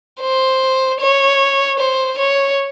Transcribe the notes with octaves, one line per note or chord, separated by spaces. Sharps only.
C5
C#5
C5
C#5